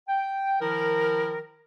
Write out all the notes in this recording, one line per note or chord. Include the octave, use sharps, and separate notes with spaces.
G5
D#3 F3 E4 A#4